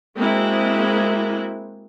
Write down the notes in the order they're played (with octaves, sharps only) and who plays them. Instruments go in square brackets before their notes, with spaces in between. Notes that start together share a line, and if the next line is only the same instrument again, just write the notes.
[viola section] G#3 A#3 C4 E4 F#4